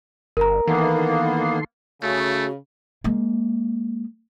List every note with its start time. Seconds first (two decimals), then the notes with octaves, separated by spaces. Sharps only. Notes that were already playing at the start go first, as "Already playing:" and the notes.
0.37 G1 A#4 A#5
0.68 D#3 E3 A#3 B3 A4 C6
2.03 C#3 A3 F#4
3.04 G#3 A#3